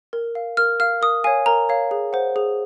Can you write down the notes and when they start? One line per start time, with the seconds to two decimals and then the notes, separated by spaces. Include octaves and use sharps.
0.13 A#4
0.35 F5
0.57 A#4 F6
0.80 F5 F6
1.01 A#4 D#6
1.24 C#5 F5 G#5
1.46 A#4 A#5
1.69 C#5 F5
1.91 G#4
2.13 C5 F#5
2.36 G#4